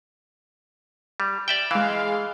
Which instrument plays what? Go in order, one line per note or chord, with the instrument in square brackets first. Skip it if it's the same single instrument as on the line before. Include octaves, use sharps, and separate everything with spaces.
[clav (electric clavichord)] G3
D5 E5 G5
[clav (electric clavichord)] E3 [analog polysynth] G#3 F5